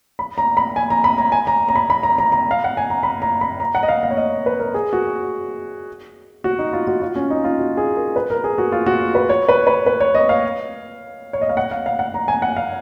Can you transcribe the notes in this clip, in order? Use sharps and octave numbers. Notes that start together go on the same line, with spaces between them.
B5
A#5
B5
G#5
A#5
B5
A#5
G#5
A#5
A#5
B5
B5
A#5
A#5
A#5
F5
F#5
G#5
A#5
B5
A#5
B5
A#5
F#5
D#5
F5
F5
C#5
D#5
B4
A#4
G#4
F#4
F#4
D#4
F4
F#4
F4
C#4
D#4
F4
F#4
G#4
A#4
B4
A#4
G#4
F#4
F4
F#4
B4
C#5
B4
B4
B4
C#5
D#5
F5
C#5
D#5
F5
F#5
F5
F5
F#5
A#5
G#5
F#5
F5